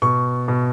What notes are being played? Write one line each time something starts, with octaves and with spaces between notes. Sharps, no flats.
B2 C#6
B2